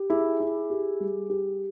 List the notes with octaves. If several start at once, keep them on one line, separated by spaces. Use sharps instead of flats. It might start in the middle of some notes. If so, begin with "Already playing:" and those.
Already playing: G4
E4 G#4
E4
G4
G3
G4